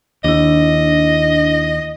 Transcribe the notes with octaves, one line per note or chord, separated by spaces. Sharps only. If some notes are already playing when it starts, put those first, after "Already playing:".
D#2 D4 E4 D#5